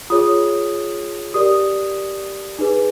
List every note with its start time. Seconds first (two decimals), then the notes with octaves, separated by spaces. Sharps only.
0.10 F4 G#4 C#5 D#6
1.34 G4 A#4 D5 D#6
2.59 D#4 G#4 B4